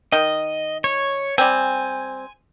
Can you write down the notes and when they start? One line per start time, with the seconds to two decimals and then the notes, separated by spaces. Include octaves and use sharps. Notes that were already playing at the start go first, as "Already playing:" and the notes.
0.12 D#3 D#5
0.84 C#5
1.38 G3 C4 G#5